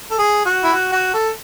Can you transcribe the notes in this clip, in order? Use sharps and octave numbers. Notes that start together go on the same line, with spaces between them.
A4
G#4
F#4
E4
F#4
F#4
A4